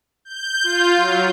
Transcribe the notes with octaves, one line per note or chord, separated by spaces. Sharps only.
G6
F4
F#3